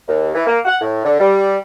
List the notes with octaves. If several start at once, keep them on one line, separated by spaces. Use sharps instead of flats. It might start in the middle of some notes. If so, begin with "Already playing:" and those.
D#2
E3
A#3
F#5
A2
D3
G3